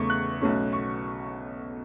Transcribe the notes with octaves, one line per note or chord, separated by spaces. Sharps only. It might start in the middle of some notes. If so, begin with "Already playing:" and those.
Already playing: E2 C#3 A3 C#6
F#6
B1 B2 A3 C#4
C#6